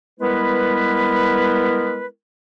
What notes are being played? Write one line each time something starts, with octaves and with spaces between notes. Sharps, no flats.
G3 G#3 B3 E4 A#4 B4